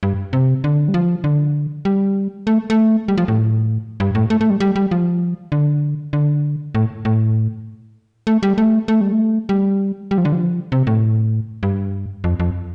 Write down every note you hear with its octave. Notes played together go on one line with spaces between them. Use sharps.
G2
C3
D3
G3
F3
D3
G3
A3
A3
G3
F3
A2
G2
A2
A3
A3
G3
G3
G3
F3
D3
D3
A2
A2
A3
G3
A3
A3
G3
A3
G3
G3
F3
D3
F3
C3
A2
G2
F2
F2